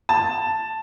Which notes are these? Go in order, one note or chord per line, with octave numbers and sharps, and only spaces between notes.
A5